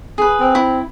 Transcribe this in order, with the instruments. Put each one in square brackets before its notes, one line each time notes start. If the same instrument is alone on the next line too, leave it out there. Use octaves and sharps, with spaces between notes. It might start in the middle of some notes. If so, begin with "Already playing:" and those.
[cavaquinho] G#4 B4
[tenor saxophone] C4
[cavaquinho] E4 B5